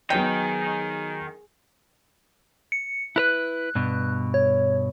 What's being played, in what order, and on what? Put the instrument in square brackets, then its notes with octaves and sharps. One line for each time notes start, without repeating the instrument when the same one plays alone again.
[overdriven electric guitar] D#3 D#5 [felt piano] F#3 B3 C#5 [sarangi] G#4 [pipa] G5
[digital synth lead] C#7
[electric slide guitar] E4 A#4 B4 [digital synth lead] F#6
[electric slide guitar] G2 B2
[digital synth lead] C#5